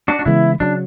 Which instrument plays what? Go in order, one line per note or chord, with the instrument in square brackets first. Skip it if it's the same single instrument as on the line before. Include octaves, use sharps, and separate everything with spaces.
[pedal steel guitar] D4 F#4
D4
[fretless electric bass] C#3 E3 G#3 B3 [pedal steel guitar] E4
[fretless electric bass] C#3 F#3 [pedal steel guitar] D4